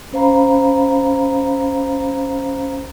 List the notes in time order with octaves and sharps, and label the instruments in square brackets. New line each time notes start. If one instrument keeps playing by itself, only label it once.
[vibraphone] C#4 C5 F5 A#5 B5